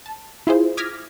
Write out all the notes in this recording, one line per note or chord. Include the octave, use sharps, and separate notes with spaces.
A5
E4 F4 G#4 C5
D6 D#6 F6 G#6 A#6 B6